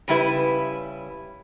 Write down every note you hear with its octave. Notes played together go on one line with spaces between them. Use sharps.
C#3 G3 E4 B4